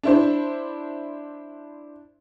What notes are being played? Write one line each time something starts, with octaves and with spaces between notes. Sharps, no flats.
D4 E4 C5